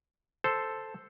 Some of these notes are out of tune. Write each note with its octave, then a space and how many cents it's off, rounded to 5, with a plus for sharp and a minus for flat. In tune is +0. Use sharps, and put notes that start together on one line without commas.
A4 +0 C5 +0